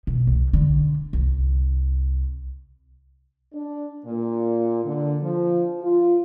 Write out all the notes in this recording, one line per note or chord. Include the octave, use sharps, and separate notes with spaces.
B2
C2
D3
C2
D4
A#2
D3
F3
F4